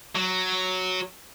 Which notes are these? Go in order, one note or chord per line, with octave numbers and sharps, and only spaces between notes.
F#3